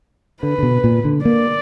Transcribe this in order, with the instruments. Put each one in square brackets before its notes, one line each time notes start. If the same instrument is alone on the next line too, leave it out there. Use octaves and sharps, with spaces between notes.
[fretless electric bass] D3 [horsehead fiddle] B4
[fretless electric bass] D3
B2
A#2
D3
[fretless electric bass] A#3 [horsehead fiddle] D5